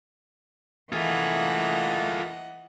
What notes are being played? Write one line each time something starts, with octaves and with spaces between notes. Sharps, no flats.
E3 A3 A#3 F4 G#4 D#5 F#5